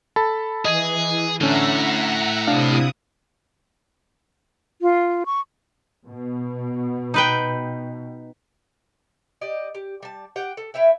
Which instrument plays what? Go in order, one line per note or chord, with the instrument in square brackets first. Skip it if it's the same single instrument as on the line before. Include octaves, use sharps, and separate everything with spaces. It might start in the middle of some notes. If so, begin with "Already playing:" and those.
[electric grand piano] A4 A5 B5
[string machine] E3 [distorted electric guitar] G#4 [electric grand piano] D#5 G#6 D#7
[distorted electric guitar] A2 [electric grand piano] D3 C#4 D4 [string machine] E5 F#5 A#5
[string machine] C3 E4 D#6 [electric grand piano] D4 F5
[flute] F4
C#6
[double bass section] B2
[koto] D#4 B4 G5
[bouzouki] G4 D5 D#5
G4
G3 A5
G4 F#5 G5
A4
E4 C#5 E5 G5